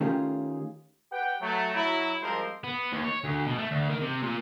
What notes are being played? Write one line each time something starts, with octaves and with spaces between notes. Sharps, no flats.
D#3 A3 C#4 F4 G4 G#4
G4 B4 F#5 G5
F#3 A3
F#3 E4
F3 G3 G#3 C4 A#4 C5
B3
D#2
C#5
D2
B2
A3
D2
D#3
C3
A#2